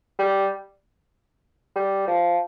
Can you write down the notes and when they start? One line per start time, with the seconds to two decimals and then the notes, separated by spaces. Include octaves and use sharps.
0.19 G3
1.76 G3
2.07 F3